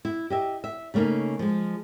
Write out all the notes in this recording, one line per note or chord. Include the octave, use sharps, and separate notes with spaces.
E4
G4 D#5 E5
E5
C#3 A3 A#3 C#4 D#4
F3 G#3